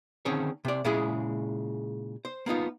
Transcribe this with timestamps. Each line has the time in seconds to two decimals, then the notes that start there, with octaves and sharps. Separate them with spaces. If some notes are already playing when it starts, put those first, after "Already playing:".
0.25 D3 D#3 C4 C#4 G#4 C#5
0.65 C3 D5
0.85 A#2 C#3 G#3 E4 G#4
2.25 C5
2.46 A#3 B3 D#4 F4